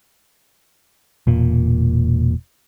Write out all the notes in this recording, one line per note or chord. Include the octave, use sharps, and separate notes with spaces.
E1 A#2